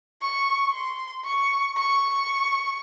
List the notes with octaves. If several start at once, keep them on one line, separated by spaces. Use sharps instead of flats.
C#6
C6
C#6
C#6